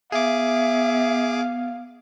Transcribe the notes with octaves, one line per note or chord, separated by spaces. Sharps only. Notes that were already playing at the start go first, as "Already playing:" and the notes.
B3 G#4 E5 F5 D6